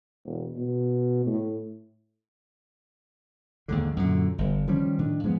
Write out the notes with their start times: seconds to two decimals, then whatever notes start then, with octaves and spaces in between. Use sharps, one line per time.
0.25 E1
0.57 B2
1.26 A2
3.68 D#2 G#2 D3
3.96 F#2 A#2 D3
4.38 G1
4.67 D#3 F3 G3 C#4
4.98 A2 D#3 D4
5.23 F3 G#3 A#3 B3